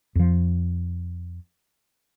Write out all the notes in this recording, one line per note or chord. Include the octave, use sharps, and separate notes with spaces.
F2 F3